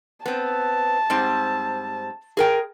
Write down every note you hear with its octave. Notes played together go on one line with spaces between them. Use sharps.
B3 C4 A5
G#2 G3 C4
G#4 A#4 G5